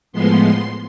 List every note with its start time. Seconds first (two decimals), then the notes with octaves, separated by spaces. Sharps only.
0.13 A2 F3 G#3 B3 C6